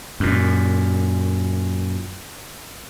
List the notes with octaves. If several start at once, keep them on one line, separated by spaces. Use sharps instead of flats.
F#2 A#2